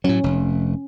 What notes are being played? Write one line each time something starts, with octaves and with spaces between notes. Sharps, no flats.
A2 F#3 C#4
F1